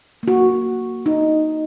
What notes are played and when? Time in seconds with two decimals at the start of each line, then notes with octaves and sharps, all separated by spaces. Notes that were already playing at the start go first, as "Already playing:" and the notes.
0.23 A#3 F#4
1.06 D#4